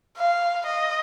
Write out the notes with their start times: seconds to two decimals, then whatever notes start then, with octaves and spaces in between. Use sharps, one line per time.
0.18 F5
0.66 D#5